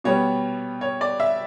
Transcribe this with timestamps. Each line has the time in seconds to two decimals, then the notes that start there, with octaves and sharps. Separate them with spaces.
0.04 B2 G3 B3 C#5
0.81 C#5
1.01 D5
1.20 E5